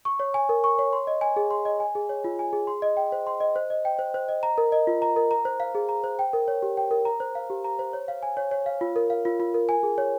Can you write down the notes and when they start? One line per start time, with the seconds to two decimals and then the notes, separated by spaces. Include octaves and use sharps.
0.05 C#6
0.20 C#5
0.34 G#5
0.49 A#4
0.64 C#6
0.79 C#5
0.93 C6
1.07 D#5
1.21 G#5
1.36 G#4
1.51 C6
1.65 D#5
1.80 G#5
1.95 G#4
2.09 C#5
2.24 F4
2.39 G#5
2.53 G#4
2.67 C6
2.82 D#5
2.97 G5
3.12 C5
3.27 C6
3.40 D#5
3.56 C5
3.70 D#5
3.85 G5
3.99 C5
4.14 C5
4.29 D#5
4.43 A#5
4.58 A#4
4.72 D#5
4.87 F4
5.02 A#5
5.16 A#4
5.31 A#5
5.45 C5
5.60 F5
5.75 G#4
5.89 A#5
6.04 C5
6.19 G5
6.33 A#4
6.48 C#5
6.62 G4
6.77 G5
6.91 A#4
7.05 A#5
7.20 C5
7.35 F5
7.50 G4
7.64 A#5
7.79 C5
7.93 C#5
8.08 F5
8.23 G#5
8.37 C#5
8.51 C#5
8.66 F5
8.81 F4
8.96 A#4
9.10 F5
9.25 F4
9.40 F4
9.54 A#4
9.69 G#5
9.83 G#4
9.98 C#5